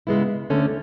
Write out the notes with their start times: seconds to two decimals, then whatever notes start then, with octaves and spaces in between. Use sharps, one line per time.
0.07 C#3 G#3 B3 E4
0.50 D2 D3 A3 C#4